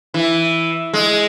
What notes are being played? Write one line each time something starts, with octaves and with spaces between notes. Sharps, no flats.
E3
G#3